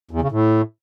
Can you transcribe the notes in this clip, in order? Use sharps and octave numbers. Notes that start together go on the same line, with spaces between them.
E2
C#3
A2